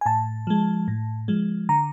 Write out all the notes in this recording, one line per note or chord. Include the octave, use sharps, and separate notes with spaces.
G#5
A2 A5
F3 G#3
A2
F3 G#3
D3 A#5